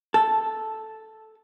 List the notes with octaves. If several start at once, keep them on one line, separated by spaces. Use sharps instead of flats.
A4